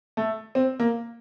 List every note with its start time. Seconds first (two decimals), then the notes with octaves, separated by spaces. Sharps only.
0.17 A3
0.55 C4
0.80 A#3